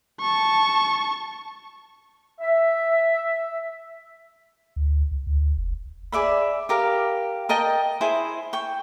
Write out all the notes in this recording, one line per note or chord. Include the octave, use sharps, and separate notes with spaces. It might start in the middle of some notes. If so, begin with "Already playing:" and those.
A5 C#6
E5
D2
C2
D2
F1
G#4 D5 E5 B5
G4 A#4 F5
A#4 D#5 G5 A5
E4 G#4 C5 B5
G5 C#6